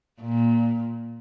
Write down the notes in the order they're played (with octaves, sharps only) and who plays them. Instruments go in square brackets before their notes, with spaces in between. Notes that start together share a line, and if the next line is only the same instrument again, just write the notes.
[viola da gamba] A#2